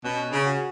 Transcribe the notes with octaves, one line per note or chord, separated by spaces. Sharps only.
B2 C#4
C#3
F#4